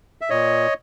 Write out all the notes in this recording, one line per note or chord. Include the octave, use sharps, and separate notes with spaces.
E5
A#2 C#5 D#5